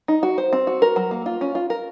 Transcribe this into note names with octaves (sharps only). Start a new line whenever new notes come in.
D#4
F#4
C5
C4
F#4
A#4
F#3
A#3
F4
C#4
F4
A#4